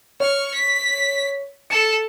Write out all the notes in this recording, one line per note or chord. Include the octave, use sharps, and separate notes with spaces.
C#5 C#6 F6
B6
A4 A5 C#7